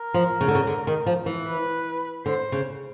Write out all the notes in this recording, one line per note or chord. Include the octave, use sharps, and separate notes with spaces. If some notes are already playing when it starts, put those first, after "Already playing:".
Already playing: A#4
F3
C#3
D3
C#3
D3
D#3
F3
E3
B4
D3 C5
C#3